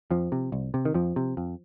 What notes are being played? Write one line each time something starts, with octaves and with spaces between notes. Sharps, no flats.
F2 F3
C3
C2
C3
D#3
F2 F3
C3
F2